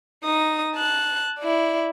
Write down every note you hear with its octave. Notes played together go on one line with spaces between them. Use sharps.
D#4 D#6
A5 F#6
E4 D5